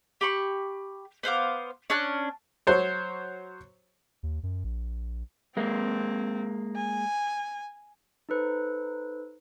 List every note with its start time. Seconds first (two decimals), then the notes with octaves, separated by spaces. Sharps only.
0.21 G4 B5 C#6
1.23 B3 C5 F5 D6
1.90 C#4 D4 F6 F#6
2.67 F#3 C5 C#5
4.23 D#2
4.43 F#2
4.64 A#1
5.57 G#3 A#3 C4
6.76 G#5
8.29 D#4 A4 B4 C5